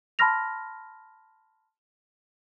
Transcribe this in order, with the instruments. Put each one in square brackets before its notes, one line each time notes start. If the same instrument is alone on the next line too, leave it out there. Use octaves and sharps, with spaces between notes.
[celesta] A5 B5 C6 F6 A#6 F7